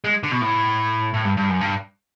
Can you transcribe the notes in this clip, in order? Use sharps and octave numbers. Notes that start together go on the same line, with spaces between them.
G#3
D3
B2
A2
A2
G2
G2
F#2
G2